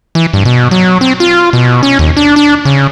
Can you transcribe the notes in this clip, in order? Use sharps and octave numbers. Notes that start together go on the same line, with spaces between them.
E3
G2
B2
F#3
C4
F4
B2
C#4
D#2
D4
D4
C#3